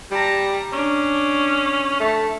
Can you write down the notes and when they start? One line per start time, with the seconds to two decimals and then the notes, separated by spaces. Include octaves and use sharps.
0.11 G3 A5 A#5
0.72 C#4 D4
2.00 A3